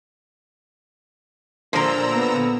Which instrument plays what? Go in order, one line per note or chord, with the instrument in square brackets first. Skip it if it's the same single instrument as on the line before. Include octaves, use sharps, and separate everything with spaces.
[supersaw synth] A#2 A#5 E6 [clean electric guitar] D3 [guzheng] F3 A#4
[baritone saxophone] B3